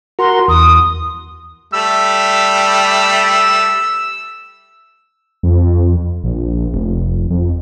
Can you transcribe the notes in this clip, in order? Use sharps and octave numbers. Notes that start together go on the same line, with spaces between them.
F#4 A#4 C6
E2 D#6
G3 A3 E6
F2
A#1
F1
F2